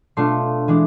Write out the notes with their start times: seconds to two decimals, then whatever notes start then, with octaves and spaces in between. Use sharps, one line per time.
0.17 B2 A3 D4 F4 C6
0.68 E3 G#3 D4